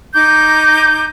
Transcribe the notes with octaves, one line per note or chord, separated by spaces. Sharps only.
D#4 A#5 D6 G6